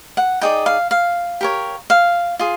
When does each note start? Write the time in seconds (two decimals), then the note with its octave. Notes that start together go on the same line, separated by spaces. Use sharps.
0.17 F#5
0.41 D#4 G#4 B4 D5 G5
0.66 F5
0.91 F5
1.41 G4 A#4 C#5
1.90 F5
2.39 F4 G#4